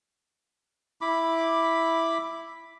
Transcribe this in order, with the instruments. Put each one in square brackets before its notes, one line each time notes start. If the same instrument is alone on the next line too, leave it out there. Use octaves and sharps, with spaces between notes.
[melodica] E4 B5 D6